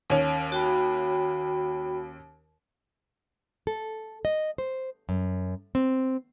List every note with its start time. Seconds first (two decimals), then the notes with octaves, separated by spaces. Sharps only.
0.10 D#2 C#4
0.52 F#4 G5 B5
3.67 A4
4.25 D#5
4.58 C5
5.09 F#2
5.75 C4